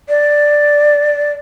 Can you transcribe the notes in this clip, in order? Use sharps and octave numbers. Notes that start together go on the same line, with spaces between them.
D5